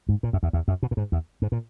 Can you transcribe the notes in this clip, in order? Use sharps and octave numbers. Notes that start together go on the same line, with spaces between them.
G#2
A#2
F#2
E2
E2
F#2
B2
A#2
G#2
E2
G#2
A#2